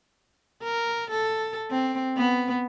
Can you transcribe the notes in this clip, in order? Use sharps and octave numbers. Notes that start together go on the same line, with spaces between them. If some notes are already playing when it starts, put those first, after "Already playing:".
A#4
A4
C4
B3